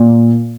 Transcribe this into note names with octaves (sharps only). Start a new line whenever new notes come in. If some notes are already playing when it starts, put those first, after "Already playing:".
Already playing: A#2